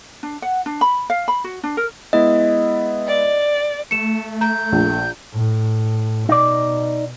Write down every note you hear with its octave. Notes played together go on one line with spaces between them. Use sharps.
D4
F#5
D4
B5
F5
B5
F#4
D4
A#4
G#3 B3 E4 D#5
D5
A3 C#7 E7
A#5 G6
A#1
A2
B2 D#4 D5